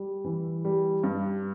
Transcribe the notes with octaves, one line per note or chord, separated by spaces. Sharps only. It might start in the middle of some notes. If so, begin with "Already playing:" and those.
Already playing: G3
E3
G3
G2